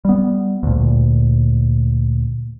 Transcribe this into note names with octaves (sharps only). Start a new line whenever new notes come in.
G3 B3
D2 A#2